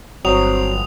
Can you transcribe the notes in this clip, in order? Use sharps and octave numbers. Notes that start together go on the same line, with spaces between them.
G1 F#3 C4 D#6 F7